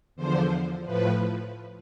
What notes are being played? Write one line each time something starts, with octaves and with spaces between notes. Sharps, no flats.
E2 D3 F3 C5
A2 F3 B4